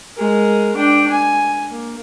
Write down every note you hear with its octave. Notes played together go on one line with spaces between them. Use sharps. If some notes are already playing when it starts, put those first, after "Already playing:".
G#3 A#4
D4 G5
G#5
A#3